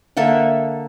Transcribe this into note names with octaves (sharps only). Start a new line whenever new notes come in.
D3 A#3 A4 E5